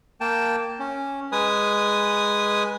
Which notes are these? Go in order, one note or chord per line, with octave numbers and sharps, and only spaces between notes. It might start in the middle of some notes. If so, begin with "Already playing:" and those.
A#3 G5 A5
C#4
G#3 B4 G#5 D#6